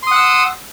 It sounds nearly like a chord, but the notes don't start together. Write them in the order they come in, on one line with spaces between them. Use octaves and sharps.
C6 D#6 F#5 E6